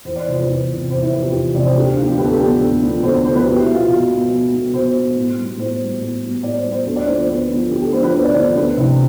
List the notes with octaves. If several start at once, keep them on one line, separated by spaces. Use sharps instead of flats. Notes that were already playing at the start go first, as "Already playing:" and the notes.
E2 C5
D5
C3 F3 C5
B4
E2
C3 F3
E2 C5
E4
C3 F3 B4
G4
E2 F4
C3 F3 D5
C5
D2 G4
D3 F3 B3 F4
G4
D2 B4
A4
G4
D3 F3 B3 A4
D2
D3 F3 B3
D2 C5
C5
D3 F3 B3 C5
B4
B2 G4
E4
B3
F4
B2
B3
B2
B3
B2 C5
B3
A2
G3 B3
A2 C5
G3 B3
A2
G3 B3
A2 D5
C5
G3 B3
C5
D2 C5
D5
D3 F3 B3 C5
C5
D2 B4
D3 F3 B3
D2 G4
A4
D3 F3 B3 C5
B4
D2 C5
D5
D3 F3 B3 C5
C5
D2 B4
C3 E3